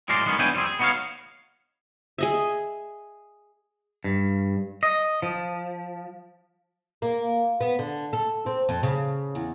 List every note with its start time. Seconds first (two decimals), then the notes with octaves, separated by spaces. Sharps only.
0.08 A2 F#3 G#3 A#4 D5 C6
0.26 D#3 G#3 B3 C#4
0.39 B3 D4 E4 C#5 G5 G#5
0.54 F2 G3 C4 G#4
0.66 G#4
0.79 B3 D#4 F#4 G#4 C#5 F5
2.18 G#4 D#5 E5
4.04 G2
4.83 D#5
5.22 F3
7.02 A#3
7.61 B3
7.79 D3
8.13 A4
8.46 C4
8.69 F2
8.83 C#3
9.35 E2